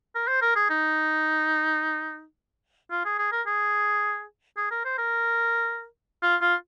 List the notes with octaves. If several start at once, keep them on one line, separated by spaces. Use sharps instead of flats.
A#4
C5
A#4
G#4
D#4
F4
G#4
G#4
A#4
G#4
G#4
A#4
C5
A#4
F4
F4